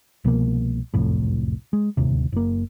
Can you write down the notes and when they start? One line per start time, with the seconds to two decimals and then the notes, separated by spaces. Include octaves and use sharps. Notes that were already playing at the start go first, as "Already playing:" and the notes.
0.24 C2 B2 F3 A#3
0.94 F#1 C2 F2 A2
1.73 G#3
1.97 D1 G1 D#2 C3
2.32 F#1 A#3